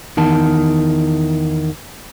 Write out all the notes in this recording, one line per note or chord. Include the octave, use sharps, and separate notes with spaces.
E2 D#3 A5